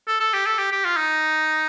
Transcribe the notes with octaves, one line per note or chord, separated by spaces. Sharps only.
A4
A4
G4
A4
G4
G4
F4
D#4